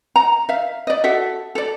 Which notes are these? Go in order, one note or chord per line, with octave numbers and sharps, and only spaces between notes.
A#5
E5 F5
D5 D#5
F#4 A4 E5
A4 D5